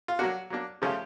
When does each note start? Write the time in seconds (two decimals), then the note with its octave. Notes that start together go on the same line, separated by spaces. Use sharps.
0.08 F4
0.19 F#3 A#3 D4 F#4
0.50 F#3 A#3 D4
0.82 C#3 F3 A3 C#4 F4 G4